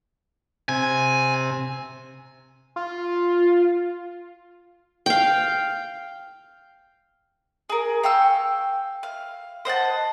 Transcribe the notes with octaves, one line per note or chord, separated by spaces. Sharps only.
C3 G#5
F4
F5 G5
G#4 A#4
F5 G5 C#6 E6
F5
C5 D#5 F#5 A5